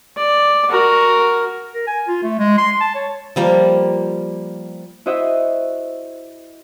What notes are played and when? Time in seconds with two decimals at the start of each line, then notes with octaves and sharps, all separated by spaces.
0.17 D5
0.69 F#4 A#4
1.74 A#4
1.87 G#5
2.07 F4
2.23 A3
2.39 G#3
2.58 C6
2.80 A5
2.95 C#5
3.36 F3 G3 A#3
5.06 E4 F#4 C5 D#5 E5 F#5